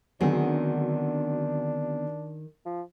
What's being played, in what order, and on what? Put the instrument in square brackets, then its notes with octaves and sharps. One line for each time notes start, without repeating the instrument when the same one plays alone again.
[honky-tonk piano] D2 F#3 [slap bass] D3 B3 C4 [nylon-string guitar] D#3 G#4 [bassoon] D4
[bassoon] F3